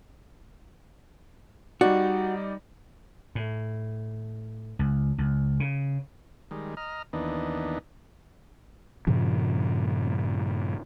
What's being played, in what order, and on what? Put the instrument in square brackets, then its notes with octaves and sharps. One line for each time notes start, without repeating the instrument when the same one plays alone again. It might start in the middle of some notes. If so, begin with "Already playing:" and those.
[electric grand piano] G3 D#4 D5 [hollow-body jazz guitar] F#4
[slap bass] A2
C#2
C#2
C#3
[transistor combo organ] D#3 G3 G#3
D#5 A#5 F6
D#2 E3 B3 D4 D#4
[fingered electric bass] G2 A#2 C#3 F3